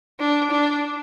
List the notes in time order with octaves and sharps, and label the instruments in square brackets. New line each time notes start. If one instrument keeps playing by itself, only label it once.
[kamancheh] D4
D4